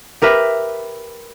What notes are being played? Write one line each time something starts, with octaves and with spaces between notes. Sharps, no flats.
G4 A#4 B4 E5